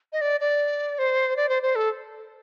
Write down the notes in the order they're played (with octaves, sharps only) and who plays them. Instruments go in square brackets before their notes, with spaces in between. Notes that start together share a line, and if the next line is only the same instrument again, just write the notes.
[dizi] D#5
D5
D5
C5
D5
C5
C5
A4